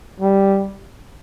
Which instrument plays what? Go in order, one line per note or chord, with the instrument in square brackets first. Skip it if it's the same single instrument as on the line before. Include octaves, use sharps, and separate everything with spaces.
[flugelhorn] G3